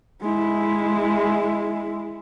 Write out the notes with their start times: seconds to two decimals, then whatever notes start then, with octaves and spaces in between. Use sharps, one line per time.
0.22 G#3 E4